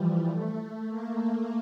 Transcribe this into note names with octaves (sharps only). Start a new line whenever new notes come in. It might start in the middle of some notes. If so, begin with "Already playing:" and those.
Already playing: E3 F3 G3
A3
A#3
A3